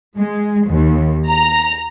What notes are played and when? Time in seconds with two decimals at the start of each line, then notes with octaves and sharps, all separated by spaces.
0.16 G#3
0.67 D#2
1.29 A#5